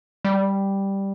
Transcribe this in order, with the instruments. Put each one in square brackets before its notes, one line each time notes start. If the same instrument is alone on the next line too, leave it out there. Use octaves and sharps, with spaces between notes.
[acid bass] G3